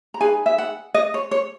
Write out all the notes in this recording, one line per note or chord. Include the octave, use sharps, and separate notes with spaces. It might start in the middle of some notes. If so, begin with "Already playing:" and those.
A#5
D#4 G#4 B4 G#5
E5
F#5
D#5
C#5
C#5